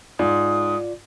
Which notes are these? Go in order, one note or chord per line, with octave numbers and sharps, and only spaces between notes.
G#2 F4 D5 D#6